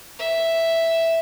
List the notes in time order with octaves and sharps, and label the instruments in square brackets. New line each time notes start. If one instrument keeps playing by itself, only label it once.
[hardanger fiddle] E5